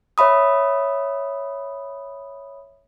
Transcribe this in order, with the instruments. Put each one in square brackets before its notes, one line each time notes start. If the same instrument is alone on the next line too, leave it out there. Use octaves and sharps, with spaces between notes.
[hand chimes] C#5 E5 B5 D#6